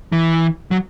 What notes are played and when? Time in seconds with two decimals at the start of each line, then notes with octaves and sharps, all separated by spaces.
0.12 E3
0.71 F#3